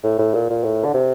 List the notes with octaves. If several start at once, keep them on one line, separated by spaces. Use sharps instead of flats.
A2
A2
A#2
A#2
A2
D3
C3